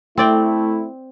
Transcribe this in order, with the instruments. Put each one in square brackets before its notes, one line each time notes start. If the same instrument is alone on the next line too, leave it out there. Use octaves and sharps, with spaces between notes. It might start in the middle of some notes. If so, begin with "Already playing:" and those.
[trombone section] A3 E4 [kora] C4 D5 G5